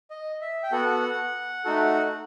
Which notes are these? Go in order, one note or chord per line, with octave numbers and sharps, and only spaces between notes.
D#5
E5
G5
B3 F#4 A4 F#5
A3 D#4 F#4 A4